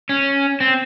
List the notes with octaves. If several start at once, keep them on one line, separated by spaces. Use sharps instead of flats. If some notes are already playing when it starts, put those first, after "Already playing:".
C#4
C4